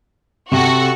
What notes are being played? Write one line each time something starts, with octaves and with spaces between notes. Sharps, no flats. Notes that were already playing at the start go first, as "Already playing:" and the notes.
C3 F#4 A4 C#6